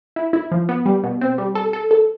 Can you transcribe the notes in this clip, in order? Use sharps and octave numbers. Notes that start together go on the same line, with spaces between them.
E4
E4
F3
B3
G3
B2
C4
G3
A4
A4
A4